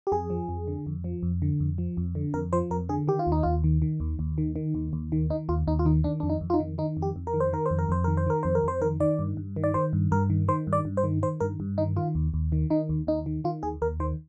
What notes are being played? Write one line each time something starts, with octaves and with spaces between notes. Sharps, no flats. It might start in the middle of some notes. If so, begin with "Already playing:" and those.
G4
F2 G#4
F3
F2
D3
F2
F3
F2
D3
F2
F3
F2
D3
F2 A#4
F3 C5
F2 A#4
D3 G#4
D#3 G4
F4
D#2
D#4
D#2 F4
D#3
D#3
D#2
D#2
D#3
D#3
D#2
D#2
D#3
D#3 D#4
D#2 F4
D#2 D#4
F4
D#3 D#4
D#3 D4
F2 D4
D#4
F2
F4
D#4
D#3
D#3 D#4
F2
G4
F2
A#4
D#3
C5
D#3 A#4
F2 C5
A#4
F2 C5
D#3 A#4
C5
D#3 A#4
F2 C5
A#4
F2 C5
D#3 A#4
D#3 D5
G2
G2
D#3
D5
D#3 C5
G2
G2 A#4
D#3
D#3 C5
G2
D5
G2
C5
D#3
D#3 C5
G2 A#4
G2
D#3 D#4
D#3 F4
D#2
D#2
D#3
D#3 D#4
D#2
D#2 D#4
D#3
D#3 F4
D#2 G#4
D#2 A#4
D#3 C5